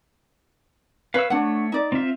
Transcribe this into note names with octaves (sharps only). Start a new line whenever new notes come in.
B4 C#5 F5 E6
A3 D4 C#5 F#5
D#4 D5
C4 F4 E5